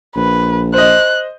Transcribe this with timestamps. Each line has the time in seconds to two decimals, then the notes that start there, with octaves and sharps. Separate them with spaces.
0.16 A#1 B4
0.74 C5 D#5 F#6